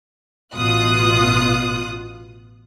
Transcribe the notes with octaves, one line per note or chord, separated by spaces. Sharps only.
A1 B2 F4 D#6 F#6